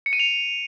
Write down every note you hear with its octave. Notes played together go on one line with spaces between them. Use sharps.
C#7
D#7
F7